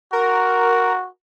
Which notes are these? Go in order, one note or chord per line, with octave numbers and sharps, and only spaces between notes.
F#4 A#4